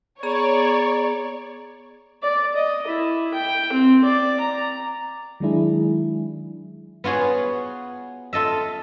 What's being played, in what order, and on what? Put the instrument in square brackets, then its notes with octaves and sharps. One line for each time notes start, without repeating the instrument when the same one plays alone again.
[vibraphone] B3 G#4 A#5 [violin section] C#5 D5
[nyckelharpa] D5
D#5
E4
G5
C4
D5
A#5
[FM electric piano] D#3 F#3 G#3 D4 E4 G#4
[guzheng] B3 F4 F#4 G#4 C#5
F4 A4 D#5 E5